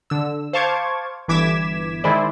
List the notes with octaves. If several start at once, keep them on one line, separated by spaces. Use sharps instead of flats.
D3 E6
C5 F5 A5 C#6 D6 G#6
G1 E3 D6 G#6 B6 E7
D#3 G#3 E4 G#4 C5 D5